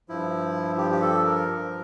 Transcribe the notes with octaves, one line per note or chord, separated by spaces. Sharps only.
G2 F3 E4
G4
G4
A4
A#4
G2 F3